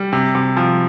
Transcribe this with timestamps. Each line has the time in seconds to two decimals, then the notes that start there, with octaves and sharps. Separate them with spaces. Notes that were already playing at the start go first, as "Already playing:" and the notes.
Already playing: G3
0.13 C3
0.35 C3
0.57 F3